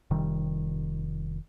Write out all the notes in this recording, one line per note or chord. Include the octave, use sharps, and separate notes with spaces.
F1 C3 D#3 G3